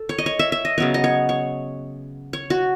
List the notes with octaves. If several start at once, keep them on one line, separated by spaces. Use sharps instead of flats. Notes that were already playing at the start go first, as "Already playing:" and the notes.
Already playing: A4
C#5
D#5
C#5
E5
E5
D#5
C#3 F#3 B3 C#5
D#5
C#5
C#5
C#5
F#4